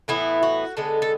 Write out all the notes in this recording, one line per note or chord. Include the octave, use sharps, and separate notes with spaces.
A2 E3 B3 E4
F#4
D3 G#3 B3 A4
A4